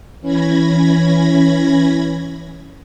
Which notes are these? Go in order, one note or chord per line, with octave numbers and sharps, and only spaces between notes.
E3 C#4 B5 G#6 A#6